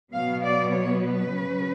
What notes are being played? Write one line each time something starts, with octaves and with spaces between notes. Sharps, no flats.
B2 F#3 B3 F5
D5
C#5
B4
C#3 F#3 C#4